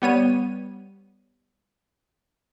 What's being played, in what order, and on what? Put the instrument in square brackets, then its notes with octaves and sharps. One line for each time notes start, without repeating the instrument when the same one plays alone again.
[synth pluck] G3 B3 C#5 D#7